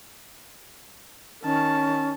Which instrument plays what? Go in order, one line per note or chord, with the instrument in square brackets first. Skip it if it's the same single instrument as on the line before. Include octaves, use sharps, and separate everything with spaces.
[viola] D#3 A5 [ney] C#4